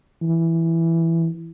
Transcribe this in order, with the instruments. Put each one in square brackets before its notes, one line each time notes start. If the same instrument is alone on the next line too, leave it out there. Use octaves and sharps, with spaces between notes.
[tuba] E3